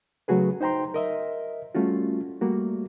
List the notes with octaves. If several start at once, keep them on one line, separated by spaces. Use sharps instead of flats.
C#3 F#3 A3 F#4 G#4 B4
D#4 C5 G5 A#5 C6
A#4 D#5 E5
G3 A3 C#4 F4 F#4
G3 A3 A#3 F#4